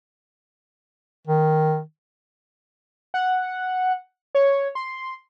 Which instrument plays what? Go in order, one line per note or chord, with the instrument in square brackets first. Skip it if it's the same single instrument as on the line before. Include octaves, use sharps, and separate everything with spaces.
[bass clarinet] D#3
[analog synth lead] F#5
C#5
C6